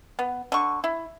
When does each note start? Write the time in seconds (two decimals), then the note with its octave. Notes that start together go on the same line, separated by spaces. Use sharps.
0.19 B3
0.52 D3 C#6
0.84 E4